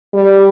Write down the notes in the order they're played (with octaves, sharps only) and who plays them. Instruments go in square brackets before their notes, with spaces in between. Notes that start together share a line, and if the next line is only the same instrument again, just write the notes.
[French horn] G3